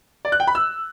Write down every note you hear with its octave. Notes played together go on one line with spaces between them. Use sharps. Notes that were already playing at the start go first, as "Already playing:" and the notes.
D5
F#6
G5
B5
E6